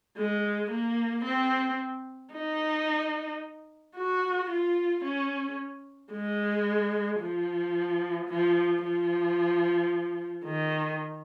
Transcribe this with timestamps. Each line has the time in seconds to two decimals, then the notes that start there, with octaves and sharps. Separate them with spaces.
0.17 G#3
0.71 A#3
1.25 C4
2.34 D#4
3.96 F#4
4.50 F4
5.04 C#4
6.12 G#3
7.20 F3
8.29 F3
8.83 F3
10.45 D#3